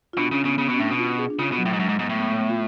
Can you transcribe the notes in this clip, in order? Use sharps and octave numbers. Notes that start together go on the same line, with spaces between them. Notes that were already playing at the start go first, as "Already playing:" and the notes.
F4
B2 D4
C#3 C#4
C#3 B3
C#3 B3
B2
C#4
A2 D4
B2
F4
G#4
D4
C#3 F4
B2
F#3
A2
G#2
F#2 G#3
G#2
G#2 B3
A2
B3
A3
B3
F4